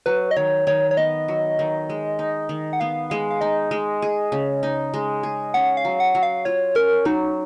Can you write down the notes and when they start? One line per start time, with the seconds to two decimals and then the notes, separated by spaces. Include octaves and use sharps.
0.06 F#3 B4
0.31 D#5
0.36 D#3 C#5
0.67 D#3 C#5
0.91 C#5
0.97 B3 D#5
1.28 F#3
1.59 D#3
1.89 G#3
2.19 D#4
2.49 D#3
2.73 F#5
2.80 B3 F5
3.10 G#3 F5
3.30 F5
3.41 D#4 D#5
3.71 G#3
4.02 G#4
4.32 C#3
4.63 D#4
4.94 G#3
5.23 G#4
5.54 C#4 F#5
5.77 F5
5.85 F#3
6.00 F#5
6.15 F#3
6.23 F5
6.45 F4 C#5
6.75 C#4 A#4
7.05 F#3 D#4